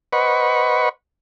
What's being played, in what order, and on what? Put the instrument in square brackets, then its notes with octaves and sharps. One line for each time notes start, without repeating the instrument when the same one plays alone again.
[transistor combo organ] B4 C5 D#5 F#5 B5 C#6